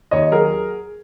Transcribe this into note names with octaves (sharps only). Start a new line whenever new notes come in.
D#2 C#5 D#5
F#3 G#4 A#4